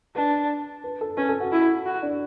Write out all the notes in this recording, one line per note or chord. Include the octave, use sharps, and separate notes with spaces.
D4 B4
B4
A4
C#4 B4
A4
F#4
E4
F#4
D4